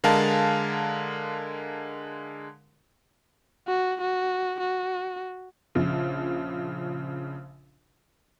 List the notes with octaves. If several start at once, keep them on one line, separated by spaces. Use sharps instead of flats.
D3 G#3 A#4 F5 A5
F#4
F#4
F#4
A#1 C#3 F3